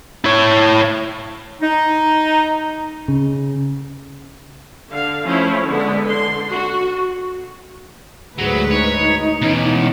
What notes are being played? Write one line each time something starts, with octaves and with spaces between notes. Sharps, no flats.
E4 C#5
D#4
C#3
D3 F5
F3 A3 C#4 E4
D3 G#3 B3
D3 C6
F#4
D2 G#2 F#3 G#4 B4
D#4 C#5
B2 E3 C#4